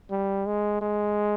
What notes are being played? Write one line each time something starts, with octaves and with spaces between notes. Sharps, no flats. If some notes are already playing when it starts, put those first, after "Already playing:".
G3
G#3
G#3